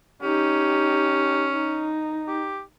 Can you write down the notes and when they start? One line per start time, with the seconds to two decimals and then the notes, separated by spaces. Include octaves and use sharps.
0.22 C#4 D#4 G4
1.52 D#4
2.28 G4